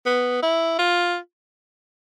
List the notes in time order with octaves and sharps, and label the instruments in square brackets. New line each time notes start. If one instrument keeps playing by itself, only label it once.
[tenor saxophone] B3
E4
F4